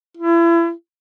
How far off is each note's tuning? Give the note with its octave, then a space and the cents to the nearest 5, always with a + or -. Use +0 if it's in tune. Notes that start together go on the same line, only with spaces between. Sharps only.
E4 +35